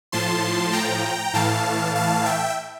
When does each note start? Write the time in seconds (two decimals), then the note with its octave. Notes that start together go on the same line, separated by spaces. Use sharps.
0.12 A2 F3 A5 C6
0.73 G5 A#5
1.34 A2 E3 F5 A5
1.95 F5 A5
2.25 E5 G5